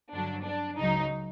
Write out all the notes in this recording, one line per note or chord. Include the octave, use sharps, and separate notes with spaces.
G2 D3 F#3 D4
D4
C#2 C#3 F#3 D#4